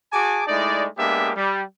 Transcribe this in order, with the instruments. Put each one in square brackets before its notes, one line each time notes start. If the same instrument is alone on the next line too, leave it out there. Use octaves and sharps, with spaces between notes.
[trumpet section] F#4 G#4 G#5 A5 D6
G#3 A3 D#4 E4 D5
G#3 A#3 B3 D4 G4 E5
G3